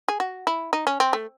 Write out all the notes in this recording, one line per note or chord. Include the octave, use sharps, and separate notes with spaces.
G#4
F#4
E4
D#4
C#4
C4
A3